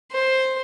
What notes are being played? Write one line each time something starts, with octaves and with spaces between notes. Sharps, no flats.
C5